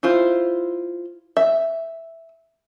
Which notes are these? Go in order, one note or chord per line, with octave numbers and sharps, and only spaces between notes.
E4 F4 C5
E5